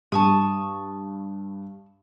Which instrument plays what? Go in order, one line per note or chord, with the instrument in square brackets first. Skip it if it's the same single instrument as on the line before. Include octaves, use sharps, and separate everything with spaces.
[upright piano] G2 [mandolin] A5 C#6 D#6